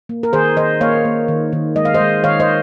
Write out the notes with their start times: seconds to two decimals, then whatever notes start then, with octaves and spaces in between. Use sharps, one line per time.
0.09 A#3
0.23 A#4
0.33 D#3 G#4 C5
0.57 D#3 C5 D#5
0.81 A#3 C#5 F5
1.05 A#3
1.28 D#3
1.53 D#3
1.76 G#3 D#5
1.85 F5
1.94 C5 D#5
2.00 G#3
2.24 D#3 C#5 F5
2.40 C5 D#5